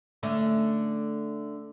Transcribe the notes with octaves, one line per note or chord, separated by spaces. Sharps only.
D3 A3 C#4